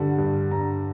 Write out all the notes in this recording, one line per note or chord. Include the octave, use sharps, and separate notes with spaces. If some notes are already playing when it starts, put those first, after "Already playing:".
Already playing: G2 D3 G3 F#5
G2
G2 A#5